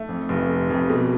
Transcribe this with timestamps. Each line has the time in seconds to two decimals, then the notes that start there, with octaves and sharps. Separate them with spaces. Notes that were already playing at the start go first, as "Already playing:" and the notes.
Already playing: A3
0.09 F2
0.29 F1
0.48 C3
0.70 F2
0.89 B2